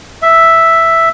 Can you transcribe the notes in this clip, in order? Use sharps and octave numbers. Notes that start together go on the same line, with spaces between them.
E5